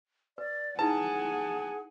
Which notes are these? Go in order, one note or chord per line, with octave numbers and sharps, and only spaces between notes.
B4 D5
D#4 E4 G#4 B4 F#5 G#5 A5